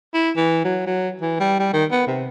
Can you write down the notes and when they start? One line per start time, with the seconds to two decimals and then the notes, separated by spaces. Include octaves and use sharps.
0.14 E4
0.36 E3
0.64 F#3
0.86 F#3
1.22 E3
1.40 G3
1.59 G3
1.73 D#3
1.91 B3
2.07 C3